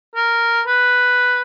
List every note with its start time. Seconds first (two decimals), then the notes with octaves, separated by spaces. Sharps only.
0.16 A#4
0.66 B4